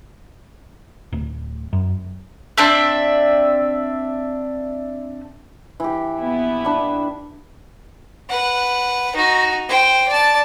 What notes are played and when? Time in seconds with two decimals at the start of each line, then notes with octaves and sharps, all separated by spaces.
1.13 D1
1.73 F#2
2.58 C4 D4 E5
5.80 E3 G4
6.20 A#1 B3 E4
6.65 D4 B4
8.30 B4 F#5
9.15 D#4 F#4
9.69 C5 G5
10.08 D5 A5